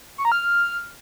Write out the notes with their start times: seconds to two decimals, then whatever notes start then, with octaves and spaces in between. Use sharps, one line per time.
0.18 C#6
0.25 A#5
0.32 F6